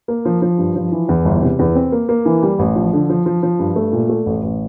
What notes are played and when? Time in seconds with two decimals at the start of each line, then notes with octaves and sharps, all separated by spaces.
0.08 A#3
0.25 F3
0.42 F3
0.58 G2
0.76 F3
0.92 E3
1.09 E2
1.25 G1
1.42 C3
1.59 E2
1.75 C4
1.92 A#3
2.09 A#3
2.25 E3
2.43 G3
2.59 A1
2.76 F3
2.93 D3
3.10 F3
3.26 F3
3.43 F3
3.59 G2
3.76 A3
3.93 A#2
4.09 A3
4.26 A1
4.43 A1